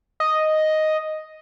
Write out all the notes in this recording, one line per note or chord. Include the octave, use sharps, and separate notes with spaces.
D#5